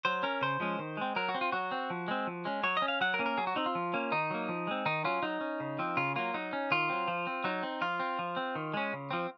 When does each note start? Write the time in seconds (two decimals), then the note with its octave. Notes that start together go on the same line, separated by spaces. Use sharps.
0.05 F#3 C5
0.23 C#4 A#4
0.42 C#3 C5
0.60 F3 G#3 C#4
0.79 D#3
0.97 G#3 C4
1.16 F#3 A#4
1.29 F#4
1.35 C4
1.41 F4
1.52 F#3 F#4
1.72 C4
1.90 F3
2.08 G#3 C4
2.27 F3
2.45 G#3 C#4
2.63 F#3 C#5
2.77 D#5
2.82 C#4
2.88 F5
3.01 F#3 F#5
3.14 A#4
3.19 A#3 C#4
3.26 A#4
3.38 F#3 G#4
3.47 F#4
3.56 C4 D#4
3.66 F4
3.75 F3
3.94 A#3 C#4
4.12 D#3 D#4
4.30 F#3 A#3
4.49 F3
4.67 G#3 C4
4.86 D#3 D#4
5.04 F#3 C#4 F4
5.23 F#3 D#4
5.41 C#4
5.60 C#3
5.79 F3 C4
5.97 C#3 F4
6.16 F#3 A#3 F4
6.34 F#3 D#4
6.53 C#4
6.71 D#3 F4
6.90 F#3 C4
7.08 F3
7.27 C4
7.44 F#3 D#4
7.63 C4
7.81 F3 F4
8.00 C4
8.19 F3
8.37 C4
8.55 D#3
8.74 G#3 C#4
8.93 C#3
9.11 F3 C4